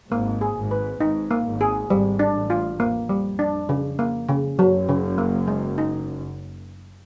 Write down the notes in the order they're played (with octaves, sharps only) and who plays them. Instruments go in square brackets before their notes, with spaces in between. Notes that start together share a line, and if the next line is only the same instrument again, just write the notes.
[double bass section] G#1 G#2 [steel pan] A#3
[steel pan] G#4
[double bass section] G#1 G#2
[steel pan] B4
[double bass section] G#1 G#2 [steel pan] D#4
[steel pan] A#3
[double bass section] G#1 G#2
[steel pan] G#4
[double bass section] G#1 G#2 [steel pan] G3
[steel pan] D4
[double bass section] A1 A2
[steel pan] F4
[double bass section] F2 [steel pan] A#3
[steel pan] G3
D4
C#3
A#3
C#3
[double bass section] F#1 F#2 [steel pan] F#3
[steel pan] C#3
A#3
G#3
D#4